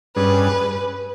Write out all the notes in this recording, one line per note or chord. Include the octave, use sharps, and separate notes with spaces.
G2 G3 C#4 G#4 B4